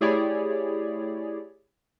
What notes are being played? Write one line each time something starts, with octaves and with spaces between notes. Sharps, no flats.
A3 E4 G4 G#4 C#5 D5